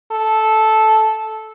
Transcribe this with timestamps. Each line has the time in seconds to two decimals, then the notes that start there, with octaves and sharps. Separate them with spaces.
0.12 A4